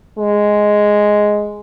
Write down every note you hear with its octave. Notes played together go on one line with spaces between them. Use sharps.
G#3